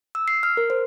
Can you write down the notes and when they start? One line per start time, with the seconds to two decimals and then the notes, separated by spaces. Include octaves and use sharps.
0.15 E6
0.28 C7
0.43 F6
0.57 A#4
0.70 C5